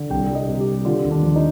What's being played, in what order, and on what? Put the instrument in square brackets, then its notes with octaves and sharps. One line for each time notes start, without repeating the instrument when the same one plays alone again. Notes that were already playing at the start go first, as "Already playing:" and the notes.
Already playing: [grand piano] D3
C2 G5
G3
D#5
C3
G4
C3
D3 F4
D#2
D4
F3
D#4